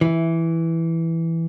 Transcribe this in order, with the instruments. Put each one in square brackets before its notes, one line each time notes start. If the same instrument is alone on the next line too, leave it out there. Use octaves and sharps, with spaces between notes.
[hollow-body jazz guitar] E3